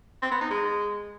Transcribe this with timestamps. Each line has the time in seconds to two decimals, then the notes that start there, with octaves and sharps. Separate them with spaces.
0.22 C4
0.32 B3
0.41 D#4
0.50 G#3